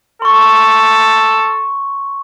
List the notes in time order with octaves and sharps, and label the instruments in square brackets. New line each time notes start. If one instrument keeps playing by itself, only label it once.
[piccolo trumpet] A4 [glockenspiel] C6 C#6